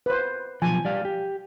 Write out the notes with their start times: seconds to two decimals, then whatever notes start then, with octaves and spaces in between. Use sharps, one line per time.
0.06 B4 C5
0.62 B1 F3 G#5
0.85 G3 D5 F5
1.05 G4